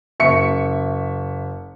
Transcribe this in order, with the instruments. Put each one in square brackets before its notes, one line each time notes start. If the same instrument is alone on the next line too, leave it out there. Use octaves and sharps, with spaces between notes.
[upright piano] F#1 E5 C#6 C#7